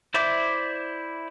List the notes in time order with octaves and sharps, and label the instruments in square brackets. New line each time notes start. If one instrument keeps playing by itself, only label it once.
[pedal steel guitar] E4 C5 D5 E5 D6